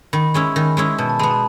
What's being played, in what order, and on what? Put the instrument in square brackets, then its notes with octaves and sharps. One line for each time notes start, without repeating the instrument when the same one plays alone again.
[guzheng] D#3 [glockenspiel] B5
[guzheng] G#3 C#4 E4
D#3
G#3 C#4 E4
[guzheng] B2 [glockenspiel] A5
[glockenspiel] A5
[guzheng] G#3 [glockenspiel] B5
[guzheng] B3
[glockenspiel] A5